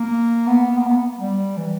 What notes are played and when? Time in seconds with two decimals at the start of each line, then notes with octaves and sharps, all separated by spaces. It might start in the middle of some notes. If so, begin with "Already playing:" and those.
Already playing: A#3
0.47 B3
0.71 B3
0.78 A#3
0.86 B3
1.20 G3
1.57 E3